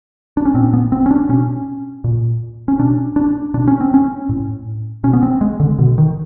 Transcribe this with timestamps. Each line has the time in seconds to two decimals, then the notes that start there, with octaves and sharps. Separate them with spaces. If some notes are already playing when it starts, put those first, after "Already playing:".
0.37 D4
0.45 C#4
0.54 A#2 C4
0.73 B3
0.92 C4
1.06 C#4
1.11 D4
1.29 B2 C#4
2.04 A#2
2.68 C#4
2.79 B2 D4
3.16 D4
3.54 B2 D4
3.68 C#4
3.81 C4
3.94 C#4
4.29 A2
5.04 B2 C#4
5.13 B3
5.23 C4
5.41 G#3
5.60 D3
5.79 B2 D3
5.98 D#3